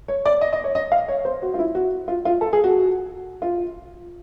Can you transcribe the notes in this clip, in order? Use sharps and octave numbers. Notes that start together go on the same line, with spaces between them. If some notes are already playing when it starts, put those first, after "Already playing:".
C#5
D5
D#5
D#5
C#5
D#5
F5
C#5
C5
F#4
F4
E4
F#4
F4
F4
A4
G#4
F#4
F4